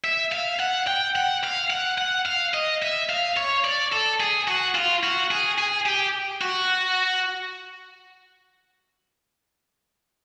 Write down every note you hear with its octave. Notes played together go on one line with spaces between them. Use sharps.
E5
F5
F#5
G5
F#5
F5
F#5
F#5
F5
D#5
E5
F5
C#5
D5
A4
G#4
F#4
F4
F#4
G#4
G#4
G4
F#4